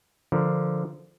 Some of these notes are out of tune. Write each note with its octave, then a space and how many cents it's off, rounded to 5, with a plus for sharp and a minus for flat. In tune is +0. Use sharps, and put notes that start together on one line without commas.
D3 +0 F3 -5 A#4 +10